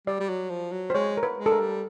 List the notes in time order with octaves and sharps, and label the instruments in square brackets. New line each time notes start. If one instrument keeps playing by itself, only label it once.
[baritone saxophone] G3 [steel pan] D5
[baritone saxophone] G3
F#3
F3
F#3
[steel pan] C5
[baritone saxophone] G#3 [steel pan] C#5
[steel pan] A#4
B4
[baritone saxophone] G#3
[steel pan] A4
A#4
[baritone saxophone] G3